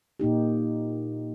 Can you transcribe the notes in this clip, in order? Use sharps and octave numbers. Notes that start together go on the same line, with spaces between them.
A#2 A#3 D#4 G4